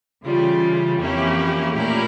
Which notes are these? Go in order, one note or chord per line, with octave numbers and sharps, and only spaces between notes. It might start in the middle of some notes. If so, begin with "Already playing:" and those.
C#3 E3 G3 F4
F2 E3 A#3 C#4 E4 G4
A#2 A3 C#4 E4 G4 A#4